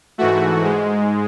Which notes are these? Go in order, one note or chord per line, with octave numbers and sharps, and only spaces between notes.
G#2 E3 A3 F#4
G#2 G#3